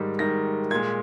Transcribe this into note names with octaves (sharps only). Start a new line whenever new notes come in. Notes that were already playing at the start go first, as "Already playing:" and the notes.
Already playing: G#2 D#3 G3
G#2 D#3 G3 A#6
A#2 G#3 G#6